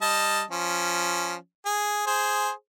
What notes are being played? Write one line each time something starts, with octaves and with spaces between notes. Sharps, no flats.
G3 D#5 A5
F3 C#4
G#4
G#4 C5